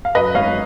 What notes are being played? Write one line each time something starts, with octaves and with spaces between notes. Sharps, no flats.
F5
F#2 B4 D#5
G#1 C#5 F5